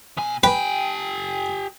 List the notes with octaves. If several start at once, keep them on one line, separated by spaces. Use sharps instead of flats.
B2 G#5
G4 B4 G5 G#5